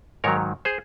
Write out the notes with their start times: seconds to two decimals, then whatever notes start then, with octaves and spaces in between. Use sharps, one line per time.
0.24 G#2 D#3 F#3 A#4 C#5
0.65 G#4 C5